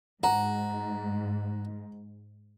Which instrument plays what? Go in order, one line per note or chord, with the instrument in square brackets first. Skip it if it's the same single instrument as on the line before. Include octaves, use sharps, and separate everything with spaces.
[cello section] G#2 [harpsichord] F#4 [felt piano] A#5